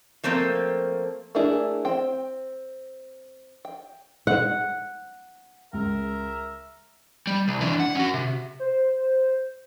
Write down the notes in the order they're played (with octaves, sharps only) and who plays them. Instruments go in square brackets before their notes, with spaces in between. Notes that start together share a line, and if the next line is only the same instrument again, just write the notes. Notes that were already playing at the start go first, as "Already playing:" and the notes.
[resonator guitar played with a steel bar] F3 A3 A#3 C4
[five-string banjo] A3 A#3 D4 E4 G#4
C4 G5
G5
[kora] F#5
[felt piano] C#2 [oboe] A#4 [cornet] E5
[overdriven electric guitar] G3
C2
E3 D4
F#5
C#4 F#4
C3
[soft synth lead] C5